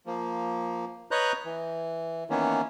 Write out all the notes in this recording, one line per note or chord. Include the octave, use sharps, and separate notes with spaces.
F3 A#3
B4 C#5 D#5 A#5 F#6 G6
E3
D#3 E3 A#3 B3 C#4